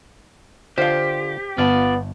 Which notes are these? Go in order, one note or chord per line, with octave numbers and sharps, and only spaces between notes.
D3 F4 G4 C5 F5
G1 B3 F4 D5 A5